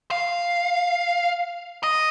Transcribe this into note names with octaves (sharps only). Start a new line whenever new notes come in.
F5
D#5